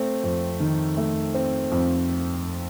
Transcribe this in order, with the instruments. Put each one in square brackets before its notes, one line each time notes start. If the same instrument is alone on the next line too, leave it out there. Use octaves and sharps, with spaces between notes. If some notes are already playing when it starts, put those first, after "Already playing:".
Already playing: [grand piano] A3 C4
F2
D#3
A3
C4
F2